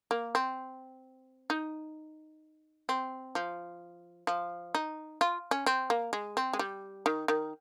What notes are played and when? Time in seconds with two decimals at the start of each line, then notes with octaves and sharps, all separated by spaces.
0.11 A#3
0.35 C4
1.50 D#4
2.89 C4
3.35 F3
4.27 F3
4.75 D#4
5.21 F4
5.51 C#4
5.66 C4
5.90 A#3
6.13 G#3
6.37 C4
6.53 G#3
6.59 G3
7.06 D#3
7.28 D#3